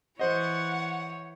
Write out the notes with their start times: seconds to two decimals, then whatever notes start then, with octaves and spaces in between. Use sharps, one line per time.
0.19 E3 C5 C#5 D#5 F#5